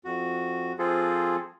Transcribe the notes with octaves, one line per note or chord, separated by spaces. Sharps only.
F2 F#4
F3 C4 F4 G#4 A4